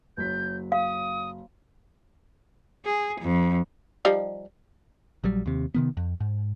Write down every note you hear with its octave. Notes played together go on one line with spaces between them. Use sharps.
F#1 F#3 G6 B6
F5 D#6
G#4
F2
F3 G3 D#4
A#1 F#3 G3
D#2 C3
C3 D#3 B3
F2
G#2